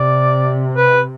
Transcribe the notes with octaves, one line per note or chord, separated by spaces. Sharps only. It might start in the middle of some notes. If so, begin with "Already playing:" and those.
Already playing: C3 D5
B4